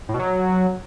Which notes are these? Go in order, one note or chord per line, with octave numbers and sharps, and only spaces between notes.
A2
B2
F#3